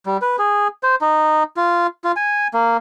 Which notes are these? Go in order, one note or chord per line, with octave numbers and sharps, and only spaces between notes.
G3
B4
G#4
C5
D#4
F4
F4
G#5
A#3